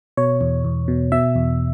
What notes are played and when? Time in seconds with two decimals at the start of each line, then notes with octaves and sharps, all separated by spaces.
0.17 B2 C#5
0.41 E2
0.64 E2
0.88 B2
1.12 B2 E5
1.35 E2